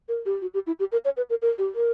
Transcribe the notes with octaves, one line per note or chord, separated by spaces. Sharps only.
A#4
G4
F#4
G4
E4
G4
A#4
C#5
B4
A#4
A#4
G4
A#4